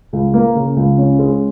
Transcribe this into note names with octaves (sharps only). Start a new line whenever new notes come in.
C#2
A#3
C#3
C#2
C#4
G#3